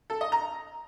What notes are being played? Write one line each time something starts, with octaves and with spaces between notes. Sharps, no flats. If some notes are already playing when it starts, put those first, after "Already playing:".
A4
D#5
A#5